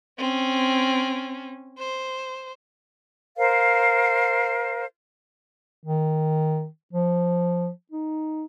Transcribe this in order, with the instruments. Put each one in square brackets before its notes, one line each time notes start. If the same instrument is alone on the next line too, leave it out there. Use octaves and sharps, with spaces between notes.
[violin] C4 C#4
C5
[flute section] A#4 C5 F5
[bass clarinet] D#3
F3
D#4